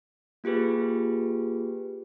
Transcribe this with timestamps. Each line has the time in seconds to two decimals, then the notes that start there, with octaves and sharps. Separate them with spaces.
0.44 A#3 F4 G4 G#4 B4